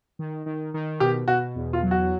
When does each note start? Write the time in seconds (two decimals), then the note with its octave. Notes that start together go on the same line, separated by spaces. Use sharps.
0.19 D#3
0.46 D#3
0.74 D#3
1.00 B2 G4
1.28 B2 F#4
1.55 E2
1.73 F4
1.83 F#3
1.91 F#4